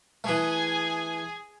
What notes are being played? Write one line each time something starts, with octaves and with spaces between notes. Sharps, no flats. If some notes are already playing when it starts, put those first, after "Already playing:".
E3 A3 G#4 G#5